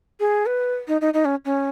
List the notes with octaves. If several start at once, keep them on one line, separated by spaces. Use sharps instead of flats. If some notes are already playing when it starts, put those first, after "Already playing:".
G#4
B4
D#4
D#4
D#4
C#4
C#4